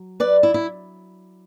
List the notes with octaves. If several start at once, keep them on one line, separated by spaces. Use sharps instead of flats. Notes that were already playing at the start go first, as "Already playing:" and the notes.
Already playing: F#3
B4 D5
E4
E4